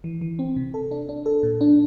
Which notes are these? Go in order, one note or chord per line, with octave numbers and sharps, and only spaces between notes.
E3
E3
C4
C3
A4
D4
D4
A4
A#2
D4